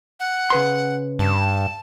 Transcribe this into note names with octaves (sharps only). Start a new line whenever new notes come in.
F#5
C#3 B4 C6
G2 A5